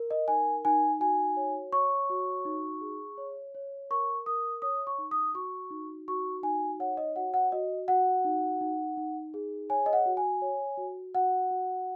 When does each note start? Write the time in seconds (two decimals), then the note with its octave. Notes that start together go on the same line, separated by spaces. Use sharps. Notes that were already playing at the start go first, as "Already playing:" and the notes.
Already playing: A#4
0.11 D#5
0.28 D#4 G#5
0.65 D#4 G#5
1.00 F#4 G#5
1.37 C#5
1.73 C#5 C#6
2.10 F#4
2.45 D#4
2.81 G#4
3.18 C#5
3.55 C#5
3.90 A#4 C#6
4.26 A#4 D#6
4.62 C#5 D#6
4.87 C#6
4.98 D#4
5.11 D#6
5.34 F#4 C#6
5.71 D#4
6.08 F#4 C#6
6.43 D#4 G#5
6.80 C#5 F#5
6.97 D#5
7.16 F#4 F#5
7.34 F#5
7.52 F#4 D#5
7.88 F#4 F#5
8.25 D#4
8.61 D#4
8.97 D#4
9.34 G#4
9.70 C#5 G#5
9.86 D#5
9.93 F#5
10.06 F#4
10.17 G#5
10.42 C#5
10.77 F#4
11.15 F#4 F#5
11.51 F#4